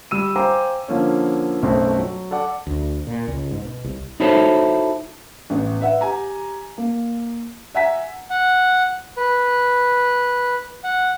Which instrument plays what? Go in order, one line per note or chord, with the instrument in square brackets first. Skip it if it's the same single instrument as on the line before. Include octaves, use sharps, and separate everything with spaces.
[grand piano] G3 E6 D#7
C5 F5 G5 G#5 A#5 D6
D3 F3 A#3 C#4
B1 F#2 B2 A3 C4
F#3
A4 D5 F#5 D6
[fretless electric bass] D2
A#2
C#2
G#2
B2
C2
[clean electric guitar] D#4 E4 F#4 A4 C5 C#5
[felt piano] A1 B3
B4 E5 F#5
G4 G#5 A#5
A#3
E5 F#5 G#5 A#5 B6
[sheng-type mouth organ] F#5
B4
F#5